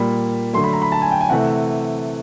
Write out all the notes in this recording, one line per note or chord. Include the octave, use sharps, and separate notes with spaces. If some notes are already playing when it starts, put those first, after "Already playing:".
Already playing: A#2 G3 A#3 B5
D3 F#3 A3 C6
B5
A#5
B5
A5
G#5
G5
G#5
C3 E3 A3 F#5